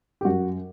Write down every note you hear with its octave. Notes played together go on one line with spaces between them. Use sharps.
G4
F#2 F#4